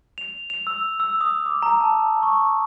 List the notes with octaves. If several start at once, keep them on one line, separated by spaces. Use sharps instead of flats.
F7
F7
E6
E6
D#6
D6
A#5
A5
C#6